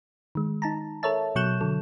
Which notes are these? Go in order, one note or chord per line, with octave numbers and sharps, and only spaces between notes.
D#3 G#3
D#4 A5 A#5
A4 A#4 C#5 E5 A5
B2 F#3 C#6 F#6 G6 E7
D3 F#3 A4